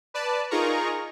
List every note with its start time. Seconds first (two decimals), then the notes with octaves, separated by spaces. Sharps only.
0.14 B4 D5 A5
0.51 D#4 F4 G#4 A#4 A#5 C#6